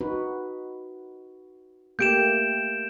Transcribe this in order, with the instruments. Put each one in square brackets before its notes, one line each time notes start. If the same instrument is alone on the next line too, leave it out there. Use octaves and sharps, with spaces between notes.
[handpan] D#4 F#4 B4
[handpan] A3 A#3 G4 [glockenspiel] G6 D7 E7